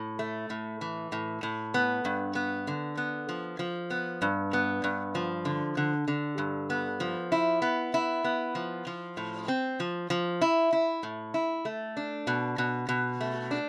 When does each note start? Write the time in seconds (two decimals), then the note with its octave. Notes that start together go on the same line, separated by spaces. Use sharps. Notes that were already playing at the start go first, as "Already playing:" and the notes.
Already playing: A2
0.19 A3
0.50 A2
0.81 E3
1.12 A2
1.43 A2
1.74 B3
2.05 G2
2.35 B3
2.67 D3
2.97 B3
3.29 F3
3.59 F3
3.90 B3
4.22 G2
4.53 B3
4.84 G2
5.15 F3
5.45 D3
5.77 D3
6.08 D3
6.38 G2
6.70 B3
7.00 F3
7.32 E4
7.62 B3
7.94 E4
8.24 B3
8.55 F3
8.87 F3
9.17 A2
9.48 C4
9.80 F3
10.10 F3
10.41 E4
10.73 E4
11.03 A2
11.34 E4
11.65 A3
11.97 D4
12.27 B2
12.58 B2
12.89 B2
13.21 A3
13.51 D4